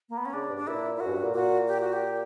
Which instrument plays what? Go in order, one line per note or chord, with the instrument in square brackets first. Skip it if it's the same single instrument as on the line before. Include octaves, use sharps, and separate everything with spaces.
[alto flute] A#3
B3
C#4
[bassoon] C#3 [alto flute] D4
[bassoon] G2
[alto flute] D4
[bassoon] A#2 [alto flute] E4
[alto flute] E4
[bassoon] A#2 [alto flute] F#4
[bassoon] F#2
G2
A#2
[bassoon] A#2 [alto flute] F#4
[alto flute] G4
F#4
G4